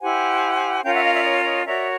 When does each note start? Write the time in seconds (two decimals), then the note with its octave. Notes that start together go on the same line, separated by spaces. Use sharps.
0.01 E4 G4 C5 F#5 G#5
0.84 C#4 F4 A#4 C#5 F5 G5
0.94 E5 F#5
1.04 D#5 F5
1.14 D5 E5
1.25 C#5 D#5
1.45 C#5 D#5
1.66 F#4 A#4 C#5 D5 E5